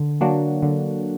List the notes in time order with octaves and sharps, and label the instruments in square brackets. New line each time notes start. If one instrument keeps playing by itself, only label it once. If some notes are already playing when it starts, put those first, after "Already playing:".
Already playing: [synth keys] D3
F#3 A#3 D4 F#4
D3